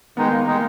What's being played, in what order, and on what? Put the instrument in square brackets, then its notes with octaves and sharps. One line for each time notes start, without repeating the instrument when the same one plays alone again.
[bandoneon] D#3 G#3 D#4 [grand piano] B3
[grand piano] A#3
[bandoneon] D#3 G#3 D#4 [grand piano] A#3